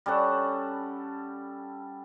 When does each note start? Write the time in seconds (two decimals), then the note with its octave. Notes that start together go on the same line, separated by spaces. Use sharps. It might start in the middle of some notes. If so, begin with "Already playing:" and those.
0.06 G3 C#4 A4 F#5